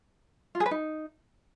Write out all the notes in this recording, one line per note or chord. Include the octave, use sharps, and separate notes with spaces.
F4
G#4
B4
D#4